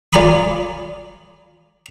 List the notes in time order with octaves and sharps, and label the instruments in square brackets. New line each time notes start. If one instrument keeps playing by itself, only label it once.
[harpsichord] F4 D5 G#5 A#5 B5 D#6